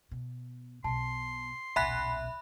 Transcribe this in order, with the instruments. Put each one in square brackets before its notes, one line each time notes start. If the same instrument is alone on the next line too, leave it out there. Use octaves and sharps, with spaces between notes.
[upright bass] B2
[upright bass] B1 B2 [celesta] A5 [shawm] C6
[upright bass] D#1 B1 [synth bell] E5 B5 F#6 [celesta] F#5 G#5 B6